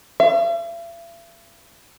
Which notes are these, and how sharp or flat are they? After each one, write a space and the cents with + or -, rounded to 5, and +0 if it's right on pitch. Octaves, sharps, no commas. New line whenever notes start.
E5 +45